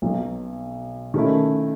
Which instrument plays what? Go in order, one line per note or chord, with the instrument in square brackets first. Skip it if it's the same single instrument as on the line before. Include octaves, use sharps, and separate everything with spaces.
[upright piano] B1 B2 F#3
D#3 A3 C#4 E4